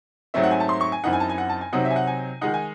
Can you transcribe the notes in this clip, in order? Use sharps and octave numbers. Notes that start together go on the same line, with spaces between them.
G#2 F#3 A3 C4 E5
F#5
G#5
A5
C6
C#6
G#5
F#2 E3 C4 D#4 F#5
G#5
A5
G#5
F#5
A5
G#5
C3 F#3 C4 D#4 F#5
E5
G#5
F#5
G#5
D#3 G#3 D#4 F#5
G#5